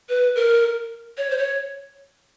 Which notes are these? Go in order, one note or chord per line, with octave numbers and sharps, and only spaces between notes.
B4
A#4
C#5
C5
C#5